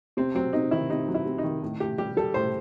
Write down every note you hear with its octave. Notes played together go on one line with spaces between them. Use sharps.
C3 C4
F#3 C4
C3 D#4
D#3 E4
C3 D#4
F#3
E4
C3
D#4
D#3
A2
A2 G4
G3 G4
G3 A4
A2 C5